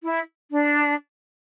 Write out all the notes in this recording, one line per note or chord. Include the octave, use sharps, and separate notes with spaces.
E4
D4